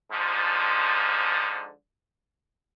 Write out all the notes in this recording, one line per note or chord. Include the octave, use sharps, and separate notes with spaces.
G#2 D3 F3